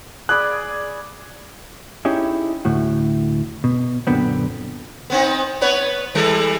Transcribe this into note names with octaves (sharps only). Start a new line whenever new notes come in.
G#4 D5 B5 F#6
C#4 D#4 E4 G4 G#4
D2 A2 F#4
B2
F#2 A#2 D3 B3 C4
B3 C4 D#4
B3 B4 C#5
E3 G3 A4